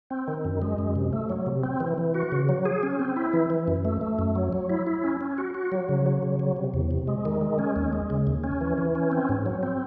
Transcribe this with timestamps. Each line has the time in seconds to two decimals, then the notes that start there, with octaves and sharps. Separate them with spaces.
0.11 C4
0.28 D#3
0.45 F#2
0.62 G#3
0.78 F#2
0.95 C3
1.13 A3
1.30 F#3
1.46 C3
1.63 C4
1.80 E3
1.98 E3
2.14 F#4
2.32 C#3
2.49 F#3
2.65 G#4
2.83 C#4
2.99 C4
3.16 E4
3.33 E3
3.50 E3
3.68 F#2
3.85 A3
4.01 A3
4.19 F#2
4.35 F#3
4.53 F#3
4.70 E4
4.87 E4
5.04 C#4
5.21 C#4
5.38 F#4
5.55 F#4
5.72 F#3
5.89 C#3
6.06 F#3
6.23 C#3
6.39 F#3
6.56 C3
6.74 E2
6.91 C3
7.07 G#3
7.25 D#3
7.41 G#3
7.59 C#4
7.76 D#2
7.93 G#3
8.10 C#3
8.27 D#2
8.44 C#4
8.61 E3
8.78 E3
8.95 C#4
9.12 C4
9.29 G#2
9.46 F#3
9.63 C4